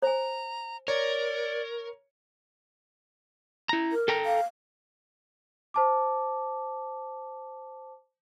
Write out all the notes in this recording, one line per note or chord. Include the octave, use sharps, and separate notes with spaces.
C5 G#5 A#5
A#4 C#5 D5
E4 A#5
A#4
A4 G5 A#5
F5
C5 A5 D6